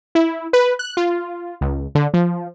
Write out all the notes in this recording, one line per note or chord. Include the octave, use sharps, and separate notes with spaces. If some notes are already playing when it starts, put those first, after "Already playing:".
E4
B4
F#6
F4
C#2
D3
F3